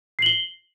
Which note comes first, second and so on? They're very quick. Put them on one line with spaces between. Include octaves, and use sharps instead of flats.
C7 F#7 G7